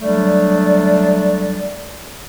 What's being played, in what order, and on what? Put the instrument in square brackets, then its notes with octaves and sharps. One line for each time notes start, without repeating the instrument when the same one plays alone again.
[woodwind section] D3 F#3 G3 A3 D4 D5